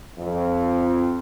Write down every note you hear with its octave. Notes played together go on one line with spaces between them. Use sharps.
F2